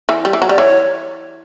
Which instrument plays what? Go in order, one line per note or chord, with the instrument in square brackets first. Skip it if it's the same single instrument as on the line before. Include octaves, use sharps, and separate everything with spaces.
[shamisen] E3
G3
E3
F#3
[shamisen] G3 [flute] D5
[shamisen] E3 [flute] C#5